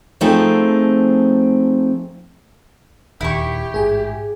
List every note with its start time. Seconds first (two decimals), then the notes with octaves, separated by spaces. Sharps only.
0.21 F3 A3 C4 D#4 G#4
3.21 D#1 D2 D#3 E4 G4 C#6
3.74 A1 G#2 G#4 G#5